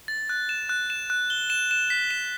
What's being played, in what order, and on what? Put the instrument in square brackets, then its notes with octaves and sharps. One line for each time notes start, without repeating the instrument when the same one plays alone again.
[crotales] A6
F#6
E7
F#6
E7
F#6
G7
E7
E7
B6
E7